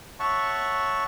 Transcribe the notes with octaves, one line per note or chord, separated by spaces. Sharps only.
C#5 E5 F#5 A5 C#6